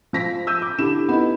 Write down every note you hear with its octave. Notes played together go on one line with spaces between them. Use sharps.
F3 A#6 B6
E6 G6 D#7
D6
D3 E4 G4 E7
B3 D#4 E4